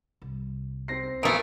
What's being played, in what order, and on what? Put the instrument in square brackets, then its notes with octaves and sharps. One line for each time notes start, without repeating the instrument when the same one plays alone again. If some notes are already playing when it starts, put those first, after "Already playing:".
[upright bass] C2
[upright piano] C4 A#6 C7
[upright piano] B1 D#6 D7 [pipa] E3 A3 [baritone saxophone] A#3